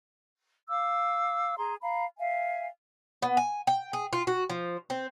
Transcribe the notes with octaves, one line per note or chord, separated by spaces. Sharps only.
F5 D6 E6
G#4 A#5 C6
F5 A#5 B5
E5 F5 G#5
B3
G#5
G5
G#4
F4
F#4
F3
C4